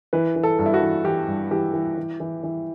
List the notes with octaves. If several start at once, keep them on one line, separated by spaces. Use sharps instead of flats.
E3 B4
E3
A4
G2
E4
F#4
E3
E3 G4
G2
E3 G4
E3
E3
E3
E3